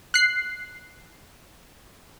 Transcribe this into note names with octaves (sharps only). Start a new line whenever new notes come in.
F#6 C7